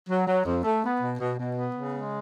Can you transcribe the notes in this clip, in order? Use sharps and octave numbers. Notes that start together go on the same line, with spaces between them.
F#3
F#3
F2
A3
B3
B2
B2
B2
B3
C#3
G#3